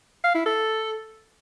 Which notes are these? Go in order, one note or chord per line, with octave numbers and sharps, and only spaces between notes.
F5
E4
A4